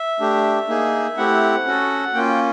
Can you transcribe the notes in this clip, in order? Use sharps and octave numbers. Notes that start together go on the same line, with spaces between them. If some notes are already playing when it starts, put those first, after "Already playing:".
Already playing: E5
A3 D4 G4
A#3 D#4 G#4
A3 C4 E4 G4 F#5
C#4 F#4 A4
A#3 C#4 F4 G5